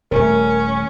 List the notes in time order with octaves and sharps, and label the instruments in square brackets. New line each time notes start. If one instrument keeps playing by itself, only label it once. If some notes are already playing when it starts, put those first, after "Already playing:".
[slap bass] D#1 A3 [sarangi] C#4 [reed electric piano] A#4